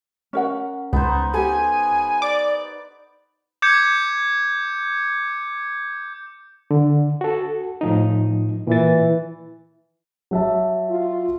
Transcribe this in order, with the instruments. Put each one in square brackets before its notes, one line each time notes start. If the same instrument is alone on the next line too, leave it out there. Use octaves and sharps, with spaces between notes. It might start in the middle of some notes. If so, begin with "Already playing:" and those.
[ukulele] C#4 A#4 F#5
[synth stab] C#2 [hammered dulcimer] B3 D#4 C5
[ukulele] G4 A4 [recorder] G#5
[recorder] D5 [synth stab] D6
[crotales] D6 G6 G#6 C#7
[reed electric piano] D3
F#4 A4
A2 F3 D#4
[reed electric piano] A#2 A6 [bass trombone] E3
[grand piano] F#3 E5 A5
[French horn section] F4